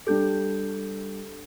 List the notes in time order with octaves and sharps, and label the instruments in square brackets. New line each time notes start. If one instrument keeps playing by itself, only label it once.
[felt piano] G3 D4 G4 [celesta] A4 G6